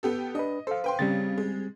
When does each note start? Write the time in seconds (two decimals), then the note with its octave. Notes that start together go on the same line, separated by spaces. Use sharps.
0.03 B3 G4 A4
0.35 D4 B4 D#5
0.67 A4 C5 F5
0.84 B4 G5 C6
0.99 C#3 G3 C4 A6
1.38 G#3